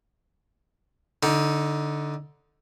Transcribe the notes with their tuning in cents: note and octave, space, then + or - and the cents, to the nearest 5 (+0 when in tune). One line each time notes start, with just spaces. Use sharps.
D3 +0 D#4 +20